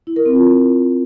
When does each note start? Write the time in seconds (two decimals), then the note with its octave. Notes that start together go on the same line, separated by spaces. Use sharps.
0.07 E4
0.16 A#4
0.26 C4
0.35 F4